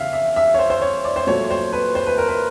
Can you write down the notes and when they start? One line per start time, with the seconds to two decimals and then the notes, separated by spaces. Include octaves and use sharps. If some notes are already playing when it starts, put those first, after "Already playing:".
Already playing: E2 C#3 E5 F5
0.13 E5
0.36 E5
0.54 C#5
0.59 C5
0.70 C5
0.82 C#5
1.05 D5
1.16 C5
1.27 A#2 F#3 A3 C#5
1.51 C5
1.73 B4
1.95 C5
2.07 B4
2.18 A#4
2.28 B4